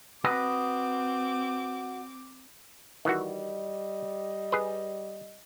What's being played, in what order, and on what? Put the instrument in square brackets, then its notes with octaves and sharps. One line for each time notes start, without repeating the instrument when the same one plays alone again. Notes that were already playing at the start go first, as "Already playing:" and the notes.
[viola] C4 D6 [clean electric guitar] F#4 B4 D#5
[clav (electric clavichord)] D#3 E3 F#4 [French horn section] G3 D#5
[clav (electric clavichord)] G#4 B4